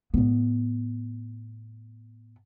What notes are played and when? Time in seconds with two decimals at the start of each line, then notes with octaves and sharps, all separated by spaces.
0.14 A2 B3